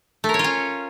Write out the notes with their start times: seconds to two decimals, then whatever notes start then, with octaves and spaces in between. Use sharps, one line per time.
0.24 A3
0.29 A#4
0.34 C#5
0.39 F4
0.44 C#4